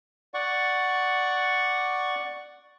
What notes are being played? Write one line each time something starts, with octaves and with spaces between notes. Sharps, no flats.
D5 F#5 C#6